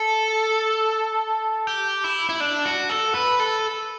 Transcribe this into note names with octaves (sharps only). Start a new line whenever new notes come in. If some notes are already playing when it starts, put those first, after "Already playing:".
Already playing: A4
G4
E4
E4
D4
F#4
A4
B4
A4